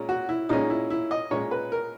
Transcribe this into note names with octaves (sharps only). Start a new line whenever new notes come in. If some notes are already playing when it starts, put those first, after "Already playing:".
Already playing: A#2 G#3 C#4
F#4
E4
A#2 G#3 C#4 D#4
E4
E4
D#5
A#2 G#3 C#4 C#5
B4
A#4